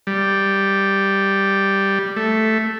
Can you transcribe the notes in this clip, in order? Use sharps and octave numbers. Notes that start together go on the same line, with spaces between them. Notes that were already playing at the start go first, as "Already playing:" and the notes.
G3
A3